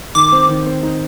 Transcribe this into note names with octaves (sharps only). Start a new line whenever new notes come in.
D#3 D6
C4
D#3
C4
D#4